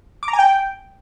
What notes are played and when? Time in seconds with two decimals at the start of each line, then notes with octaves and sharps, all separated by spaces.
0.23 D6
0.28 A#5
0.33 G#5
0.39 G5